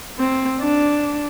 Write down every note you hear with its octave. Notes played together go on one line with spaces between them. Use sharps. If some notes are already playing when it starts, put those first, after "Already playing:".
C4
D4